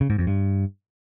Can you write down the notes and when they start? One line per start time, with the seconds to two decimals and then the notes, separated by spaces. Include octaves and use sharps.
0.01 C#3
0.10 G#2
0.18 F2
0.27 G2